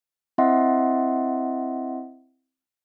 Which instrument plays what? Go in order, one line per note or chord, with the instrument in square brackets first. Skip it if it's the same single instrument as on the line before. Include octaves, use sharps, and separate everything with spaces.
[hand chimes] C4 E4 D#5 E5 F#5 C6